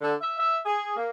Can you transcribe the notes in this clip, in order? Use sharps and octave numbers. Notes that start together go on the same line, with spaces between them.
D3
E5
E5
G#4
A#3